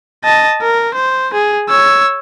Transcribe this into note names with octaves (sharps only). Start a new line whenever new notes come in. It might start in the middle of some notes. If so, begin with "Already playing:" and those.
D#5 A5
A#4
C5
G#4
C#5 E6